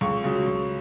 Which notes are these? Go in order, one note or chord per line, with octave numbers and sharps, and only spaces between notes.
C#2 C#6
C#3 F#3
C#2